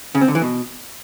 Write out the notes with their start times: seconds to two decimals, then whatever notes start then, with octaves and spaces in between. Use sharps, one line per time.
0.15 C#3
0.21 C4
0.28 D3
0.35 E3
0.42 B2